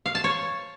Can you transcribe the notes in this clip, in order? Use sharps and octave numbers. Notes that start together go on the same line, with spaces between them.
F5
A5
C#5